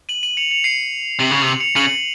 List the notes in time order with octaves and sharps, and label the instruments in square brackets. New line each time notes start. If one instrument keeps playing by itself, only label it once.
[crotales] D#7 F#7
D#7 F#7
C#7 F7
C#7 F7
C7 D#7
[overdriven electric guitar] C3 [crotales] F#7
[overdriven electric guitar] C#3 [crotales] F7
[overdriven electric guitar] C3 [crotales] D#7
[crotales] C#7 F7
[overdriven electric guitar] C#3 [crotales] D#7 F#7